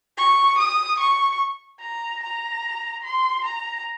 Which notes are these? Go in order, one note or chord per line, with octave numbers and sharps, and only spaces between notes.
C#6
D#6
C#6
A#5
A#5
C6
A#5